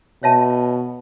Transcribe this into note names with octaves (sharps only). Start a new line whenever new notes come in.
B2 C#5 E5 A5